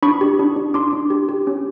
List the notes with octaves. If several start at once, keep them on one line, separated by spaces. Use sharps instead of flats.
D4 B5 C#6
G4
D4
D4
D4 C6 D6
D4
G4
G4
C#4